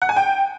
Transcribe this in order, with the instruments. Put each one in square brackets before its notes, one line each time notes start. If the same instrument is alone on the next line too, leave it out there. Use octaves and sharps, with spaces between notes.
[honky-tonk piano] F#5
G#5
G5